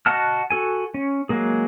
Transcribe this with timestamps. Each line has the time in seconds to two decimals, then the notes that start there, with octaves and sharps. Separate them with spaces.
0.06 F#4 D#5 F#5 A5 F6
0.50 F#4 A4 G#5
0.94 C#4
1.29 F#3 G#3 A#3 G#4